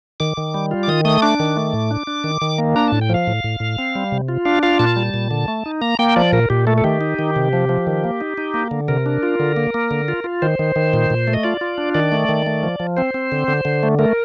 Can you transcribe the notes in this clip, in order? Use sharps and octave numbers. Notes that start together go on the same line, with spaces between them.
D#3 D6
D#3
G3
F4
D6
D#3 D#6
A3 D#6
D4 D6
D#3
A3
A2
D4
D4
D#3
D#3
A#3
D4 A#5
A2 A5
G5
F3 F5
A2
A2
A2
C4
G3
C3
F4
D4 F5
F4 F5
A#2 A5
G3
A#2
D3
A3
D#4
A#3 A#5
A#3 G5
F3 D5
A#2 A#4
A#2 G4
A3 A4
A4
D#3 G4
D#4
D#3
C3
F3
F3
D#3
A#3
D#4
D#4
A#3
D3
C3 A#4
D4
F4
D3
A#3
A#3
D3
F4
F4
D#3 C5
D#3
D#3
A#2
A#2
A3
D#5
F4 D5
F4
D4
D#3 D5
A3
D#3
A3
F3
F3
C4 C5
C4
D3
D3
D3
A3
A3 A#4